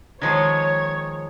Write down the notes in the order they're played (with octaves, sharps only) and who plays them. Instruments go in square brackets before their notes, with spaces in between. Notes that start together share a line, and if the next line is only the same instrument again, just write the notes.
[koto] D#3 F3 G#3 [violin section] C#5 [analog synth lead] G#6